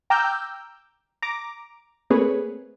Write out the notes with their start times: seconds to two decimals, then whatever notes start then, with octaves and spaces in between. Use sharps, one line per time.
0.10 G5 A#5 D6 E6 F6 G6
1.22 A#5 D6
2.10 A3 A#3 C4 G#4 B4 C#5